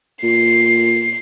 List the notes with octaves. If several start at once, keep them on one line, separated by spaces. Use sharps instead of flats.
A#2 C7